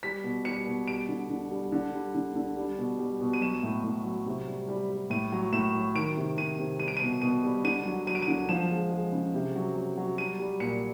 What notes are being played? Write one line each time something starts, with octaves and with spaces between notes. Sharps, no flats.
G3 B6
B2
G3 C#7
B2
G3 D7
D3
D3
G3
D3
G3
D3
D3
G3
B2
G3
B2
D#7
F#3 E7
A2
A2
F#3
C3
G3
G3
G3
A2 D#7
F#3
A2 E7
F#3
D#3 D7
C3
C3 D#7
C3
G3 D#7
D7
B2 D#7
B2 D#7
G3
D3 D#7
F#3
F#3 D#7
D7
D#7
D3
F3 E7
G#3
G#3
C#3
C3
F#3
F#3
F#3
G3 D#7
G3
A#2 C#7